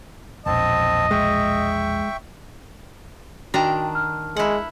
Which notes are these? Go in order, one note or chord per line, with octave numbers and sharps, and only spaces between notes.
E1 A#1 C4 D#5 A5
G#3 E5 G5 C#6
D#3 D4 F#4 G5 A#5
F6
G#3 E4 F#5